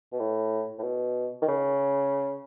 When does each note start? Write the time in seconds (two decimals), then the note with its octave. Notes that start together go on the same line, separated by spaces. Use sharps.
0.12 B2
0.19 A2
0.79 A2
0.83 B2
1.42 D#3
1.48 C#3